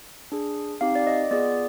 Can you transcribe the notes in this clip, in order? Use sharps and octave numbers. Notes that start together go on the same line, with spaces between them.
D4 G#4
C4 D#4 G4 F5
D5
D#5
B3 F4 G#4 D5